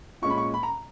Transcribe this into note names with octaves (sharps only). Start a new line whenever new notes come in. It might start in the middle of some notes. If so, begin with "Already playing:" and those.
A#2 G#3 C#4 C#6
B5
C#6
B5
A#5